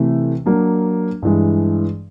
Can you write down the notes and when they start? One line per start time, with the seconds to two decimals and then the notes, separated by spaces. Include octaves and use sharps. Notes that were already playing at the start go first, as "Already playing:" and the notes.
Already playing: C3 E3 A3
0.46 F#3 A#3 D4
1.22 G2 E3 G#3